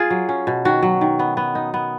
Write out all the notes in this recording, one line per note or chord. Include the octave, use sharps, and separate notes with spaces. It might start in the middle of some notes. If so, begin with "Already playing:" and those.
Already playing: F4 G#4
F#3
C#4
B2
D#3 F#4
F#3
D#3
B3
B3
D#4
B3